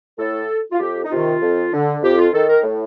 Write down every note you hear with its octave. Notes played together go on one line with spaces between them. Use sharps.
A2 A4
F4
F2 G4
D#4
C3 D#3 F4
F2
D3
F2 G4
F4
D#3 A4
A#4
A2